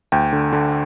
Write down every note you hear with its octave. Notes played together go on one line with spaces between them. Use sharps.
D2 G5
D3
D3